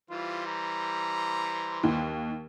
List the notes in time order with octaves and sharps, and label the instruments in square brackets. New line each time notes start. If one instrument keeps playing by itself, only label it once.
[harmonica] E3 G3 C5 [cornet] F4
[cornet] A#5
[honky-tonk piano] D#2